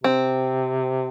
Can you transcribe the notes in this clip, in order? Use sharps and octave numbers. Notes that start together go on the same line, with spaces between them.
C3 C4